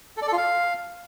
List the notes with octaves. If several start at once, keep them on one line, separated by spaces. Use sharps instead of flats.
A4
D5
A4
F4
F5